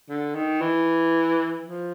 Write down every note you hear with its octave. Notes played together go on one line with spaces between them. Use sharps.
D3
D#3
E3
F3